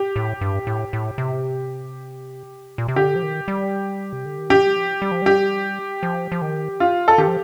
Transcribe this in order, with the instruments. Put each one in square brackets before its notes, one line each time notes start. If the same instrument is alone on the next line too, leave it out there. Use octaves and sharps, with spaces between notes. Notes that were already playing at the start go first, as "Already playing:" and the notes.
Already playing: [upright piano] G4
[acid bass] A2
G2
A2
A2
C3
A#2
C3
[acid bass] D3 [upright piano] G4
[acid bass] F3
D#3
G3
C3
D3
D#3
[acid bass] F3 [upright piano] G4
[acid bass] G3
F3
G3
F3
[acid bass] G3 [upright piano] G4
[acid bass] F3
F3
D#3
[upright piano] F4
A4
[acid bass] D#3 [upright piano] G4
[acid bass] F3